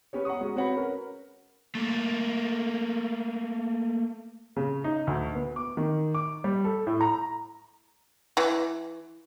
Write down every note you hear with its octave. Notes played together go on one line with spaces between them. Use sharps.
B3 C#4 G4 C#5
F#5 A#5 C#6 D#6
G#3 C#4 F#4
C4 F#4 B4 C#5 F#5 B5
C#4 A#4 B4
A3 A#3
C#3
D#4
D2
B3
D6
D#3
D6
G3
A4
A2
A#5
E3